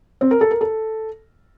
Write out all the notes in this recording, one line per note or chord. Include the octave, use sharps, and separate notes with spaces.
C4
A#4
A4
A#4
A4